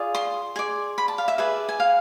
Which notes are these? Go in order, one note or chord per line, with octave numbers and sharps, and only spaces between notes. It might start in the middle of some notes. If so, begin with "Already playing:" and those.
Already playing: F4 G#4 D5
C6
G#4 D5
B5
A5
F5
E5
G#4 B4 D5 E5
G#5
F5